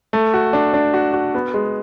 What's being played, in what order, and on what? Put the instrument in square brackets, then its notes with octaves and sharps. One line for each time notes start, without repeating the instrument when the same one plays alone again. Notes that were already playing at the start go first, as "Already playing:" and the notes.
[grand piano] A3
F#4
D4
D4
F#4
F#4
B3
G#3